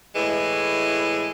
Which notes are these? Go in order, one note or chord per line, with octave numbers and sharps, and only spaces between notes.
A2 E3 G#3